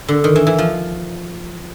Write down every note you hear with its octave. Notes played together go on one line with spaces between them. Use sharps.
D3
D#3
E3
E3
F3